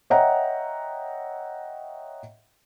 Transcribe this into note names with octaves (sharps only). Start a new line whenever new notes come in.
C#5 D#5 E5 F#5 G5 A#5